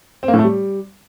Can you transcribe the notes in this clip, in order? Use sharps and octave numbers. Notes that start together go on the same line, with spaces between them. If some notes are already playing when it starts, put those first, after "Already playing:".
C4
A#3
A2
A3
G3